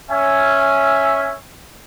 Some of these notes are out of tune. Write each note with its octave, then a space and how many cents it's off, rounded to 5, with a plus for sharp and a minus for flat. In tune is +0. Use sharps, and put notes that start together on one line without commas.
C#4 +0 E5 +0 G#5 +0